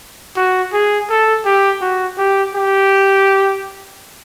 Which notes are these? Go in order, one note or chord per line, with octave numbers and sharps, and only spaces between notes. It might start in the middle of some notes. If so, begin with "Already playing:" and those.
F#4
G#4
A4
G4
F#4
G4
G4